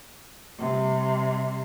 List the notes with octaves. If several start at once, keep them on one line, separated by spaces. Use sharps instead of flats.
C3 G3